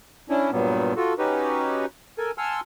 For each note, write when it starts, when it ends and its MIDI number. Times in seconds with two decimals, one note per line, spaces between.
0.29 0.51 61
0.29 0.51 62
0.29 0.51 64
0.52 0.93 43
0.52 0.93 46
0.52 0.93 54
0.52 0.93 55
0.52 0.93 59
0.96 1.14 65
0.96 1.14 66
0.96 1.14 69
1.18 1.86 61
1.18 1.86 63
1.18 1.86 66
1.18 1.86 67
1.18 1.86 71
2.18 2.31 69
2.18 2.31 70
2.18 2.31 80
2.38 2.61 78
2.38 2.61 80
2.38 2.61 81
2.38 2.61 84
2.38 2.61 88
2.38 2.61 89